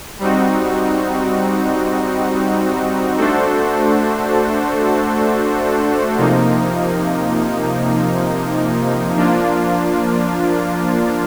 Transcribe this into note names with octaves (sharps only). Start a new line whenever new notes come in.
G3 C4 D#4 F#4
A3 D4 F#4 A4 C5
C3 F3 A#3 D#4
F3 A#3 D4 F4